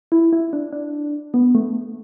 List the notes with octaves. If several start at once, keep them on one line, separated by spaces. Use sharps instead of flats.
E4
E4
D4
D4
B3
A3